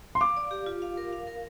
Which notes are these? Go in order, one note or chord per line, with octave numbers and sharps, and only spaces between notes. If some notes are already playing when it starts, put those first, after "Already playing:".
C6
F5 D6
D5
G4
F4
F5
A#4
F5
A#4